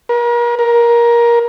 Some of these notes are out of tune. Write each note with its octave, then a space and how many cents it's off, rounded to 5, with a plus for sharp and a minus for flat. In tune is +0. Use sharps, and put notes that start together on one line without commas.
A#4 +40
A#4 +20